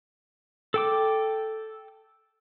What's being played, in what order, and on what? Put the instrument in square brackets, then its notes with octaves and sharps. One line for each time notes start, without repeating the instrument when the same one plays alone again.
[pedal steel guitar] A4 G5 D6